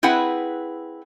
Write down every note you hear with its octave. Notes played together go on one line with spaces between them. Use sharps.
C4 E4 G#4 B4 F#5